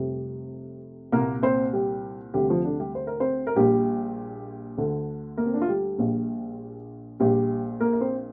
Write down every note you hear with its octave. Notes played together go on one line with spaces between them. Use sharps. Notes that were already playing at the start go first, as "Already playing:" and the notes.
Already playing: F1 F2 C3 G3
C2 A#2 A#3 A#4
C4 C5
G3 G4
D2 C3 G3 G4
F3 F4
D3 D4
G3 G4
C5
A#4
C4 C5
A#4
A#1 A#2 G3 G4
D2 D3
A#3 A#4
C4
D4
F4
G3 G4
A#1 A#2
A#1 A#2 G3 G4
A#3 A#4
A#4
C4 C5